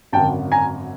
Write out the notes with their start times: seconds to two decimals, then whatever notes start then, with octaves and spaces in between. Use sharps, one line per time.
0.12 G#1 F#2 D3 G5 A5
0.52 G#5 A#5